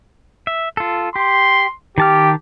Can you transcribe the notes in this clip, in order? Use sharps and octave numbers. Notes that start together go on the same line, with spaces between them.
E5
F4 A4
G4 C6
D#3 G4 A5 F6